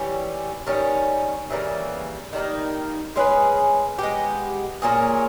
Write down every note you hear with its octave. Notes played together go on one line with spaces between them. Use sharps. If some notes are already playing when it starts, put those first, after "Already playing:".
Already playing: E3 G3 C#4 G4
D#3 G3 C#4
C#3 E3 G3 A#3
D#3 G3 A#3 D#4
G#3 C#4 G#4 B4
G#3 B3 G4
A#2 A#3 C#4 G#4